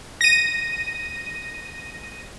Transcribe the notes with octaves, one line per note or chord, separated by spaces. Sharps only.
A#6 D#7